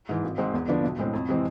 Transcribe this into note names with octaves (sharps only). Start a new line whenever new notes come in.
G#2 E3
G#1
G#2 G#3 C4
E2
D3 F3 B3 D4
B1
A2 G#3 C4
F2
C3 E3 G#3 C4